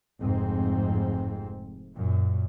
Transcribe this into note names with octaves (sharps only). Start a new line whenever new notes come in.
F1 G#2 C4
F#2 A#2